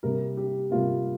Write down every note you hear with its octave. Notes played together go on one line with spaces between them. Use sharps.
C3 G3 A#3 A#4
G4
C3 G3 A#3 F4